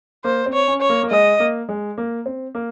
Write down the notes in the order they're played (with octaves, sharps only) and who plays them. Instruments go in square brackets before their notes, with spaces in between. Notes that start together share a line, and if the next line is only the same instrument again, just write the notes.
[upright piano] A#3 [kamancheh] C5
[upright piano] C4
[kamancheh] C#5
[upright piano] C#4
[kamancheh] C#5
[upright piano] A#3
A#3
[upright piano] G#3 [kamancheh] D#5
[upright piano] A#3
G#3
A#3
C4
A#3